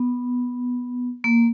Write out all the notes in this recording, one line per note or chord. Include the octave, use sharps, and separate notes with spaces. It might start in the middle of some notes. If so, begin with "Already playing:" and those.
Already playing: B3
A#3